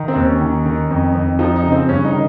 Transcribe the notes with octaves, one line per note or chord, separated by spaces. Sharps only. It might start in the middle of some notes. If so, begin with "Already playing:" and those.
Already playing: D#3
C4
D#2
C#4
D#3
D#3
F2
F2
F3 D#4
D#4
C#3
C4
G2 C#4
D#4
D#3